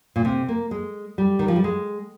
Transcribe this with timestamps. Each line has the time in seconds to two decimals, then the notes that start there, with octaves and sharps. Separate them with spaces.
0.16 A#2
0.25 C3
0.48 A#3
0.71 G#3
1.18 G3
1.39 D#3
1.48 F3
1.56 G3
1.64 G#3